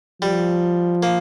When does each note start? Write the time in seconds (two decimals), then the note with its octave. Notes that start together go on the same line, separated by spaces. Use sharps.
0.22 F3 G3
1.03 A#3